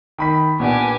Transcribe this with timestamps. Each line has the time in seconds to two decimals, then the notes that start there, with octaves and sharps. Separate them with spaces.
0.18 D#3 B5 B6
0.60 A#2 B3 D4 G4 G#5